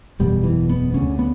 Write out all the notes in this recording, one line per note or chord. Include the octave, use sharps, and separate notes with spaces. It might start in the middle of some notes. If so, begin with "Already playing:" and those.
F#1 E2 B2 G3
E3
B3
D2 C#3 C#4
B3